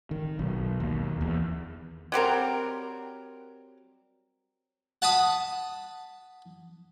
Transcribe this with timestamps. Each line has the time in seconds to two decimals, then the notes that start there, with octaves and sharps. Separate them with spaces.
0.11 D#3
0.39 B1
0.80 D#2
1.21 E2
2.12 F#3 G3 C4 A#4
5.02 F#5 A5 B5 D#6